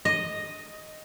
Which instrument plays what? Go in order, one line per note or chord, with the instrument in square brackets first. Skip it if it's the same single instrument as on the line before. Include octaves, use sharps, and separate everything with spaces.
[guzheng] D#5